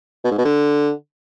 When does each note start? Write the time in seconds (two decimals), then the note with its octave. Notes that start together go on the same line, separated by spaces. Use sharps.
0.24 B2
0.31 G#2
0.38 B2
0.45 D3